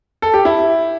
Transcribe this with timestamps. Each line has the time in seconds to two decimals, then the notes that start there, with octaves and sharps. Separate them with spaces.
0.22 A4
0.34 G4
0.45 E4